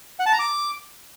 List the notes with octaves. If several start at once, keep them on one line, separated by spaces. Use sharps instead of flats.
F#5
A5
A#5
D6